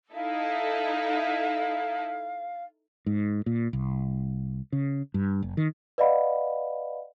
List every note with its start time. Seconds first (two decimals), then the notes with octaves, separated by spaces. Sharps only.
0.14 D#4 E4 A4 F5
3.06 G#2
3.46 A#2
3.73 C2
4.72 C#3
5.14 G2
5.42 F#1
5.57 D#3
5.98 B4 D5 D#5 F5 F#5 B5